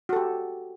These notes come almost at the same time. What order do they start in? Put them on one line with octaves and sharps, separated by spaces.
F#4 A4 G4